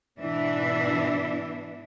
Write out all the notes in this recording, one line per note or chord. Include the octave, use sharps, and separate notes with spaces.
G#2 B2 E3 B3 D4 E5